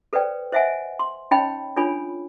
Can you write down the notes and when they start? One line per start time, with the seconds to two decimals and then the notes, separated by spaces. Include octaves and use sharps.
0.13 A4 B4 C5 D5 G5
0.52 C5 D#5 E5 F#5 G#5
0.99 C6
1.31 C#4 D#4 C#5 D#5 G5 B5
1.76 D4 F4 A4 C#5 G#5 B5